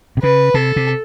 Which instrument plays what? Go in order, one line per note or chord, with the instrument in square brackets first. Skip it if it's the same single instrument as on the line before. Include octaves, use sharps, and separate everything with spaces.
[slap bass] C3
[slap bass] C#3 [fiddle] B4
[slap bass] C3 [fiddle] A4
[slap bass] C3